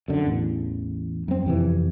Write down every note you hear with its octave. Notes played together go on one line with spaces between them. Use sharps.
F#2 D3
A1 E2
F#2 C4
F2 C3 E3